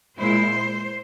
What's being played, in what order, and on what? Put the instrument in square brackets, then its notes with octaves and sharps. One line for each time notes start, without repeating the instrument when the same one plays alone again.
[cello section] A#2 G#3 E4 C5